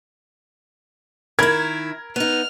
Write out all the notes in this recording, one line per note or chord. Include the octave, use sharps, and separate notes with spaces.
D#3 E4 A#4 B5 G#6
B3 D#4 F6